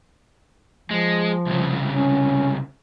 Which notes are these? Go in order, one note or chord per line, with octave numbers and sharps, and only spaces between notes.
F3 G#3
C2 C#3
C#4